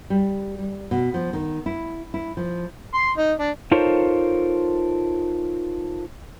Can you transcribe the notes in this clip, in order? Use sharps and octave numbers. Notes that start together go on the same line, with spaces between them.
G3
G3
B2
F3
D#3
E4
E4
F3
C6
D#4
D4
D#4 F4 A4 A#4 C5 C#5